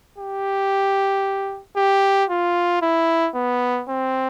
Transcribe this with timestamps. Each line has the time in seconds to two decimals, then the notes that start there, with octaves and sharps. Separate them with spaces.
0.18 G4
1.77 G4
2.30 F4
2.82 E4
3.35 B3
3.89 C4